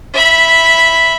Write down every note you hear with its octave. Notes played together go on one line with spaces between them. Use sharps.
E5 B5